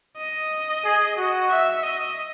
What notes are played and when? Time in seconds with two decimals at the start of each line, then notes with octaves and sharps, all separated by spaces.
0.18 D#5
0.84 G#4
1.17 F#4
1.50 E5
1.83 D#5